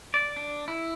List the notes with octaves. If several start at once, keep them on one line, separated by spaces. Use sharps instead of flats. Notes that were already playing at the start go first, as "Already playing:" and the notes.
D5
D4
E4